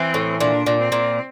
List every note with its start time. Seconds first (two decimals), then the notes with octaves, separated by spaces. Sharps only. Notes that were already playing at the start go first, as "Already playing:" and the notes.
Already playing: E3 C4
0.14 A2
0.40 A#2 D4
0.66 A#2
0.79 C4
0.92 A#2